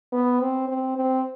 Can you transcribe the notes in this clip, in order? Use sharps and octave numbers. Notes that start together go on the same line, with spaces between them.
B3
C4
C4
C4